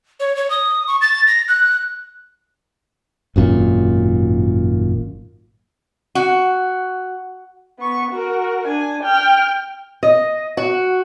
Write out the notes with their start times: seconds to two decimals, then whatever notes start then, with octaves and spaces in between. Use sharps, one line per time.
0.20 C#5
0.36 C#5
0.50 D#6
0.87 C#6
1.01 A6
1.27 A#6
1.48 F#6
3.36 G#1 F#2 A#2
6.15 F#4
7.79 B3 C#6
8.11 F#4 A#4
8.67 D4 G#5
9.03 G5 F6
10.03 D#5
10.57 F#4